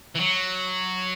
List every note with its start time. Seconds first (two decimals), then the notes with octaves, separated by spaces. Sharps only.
0.15 E3
0.20 F#3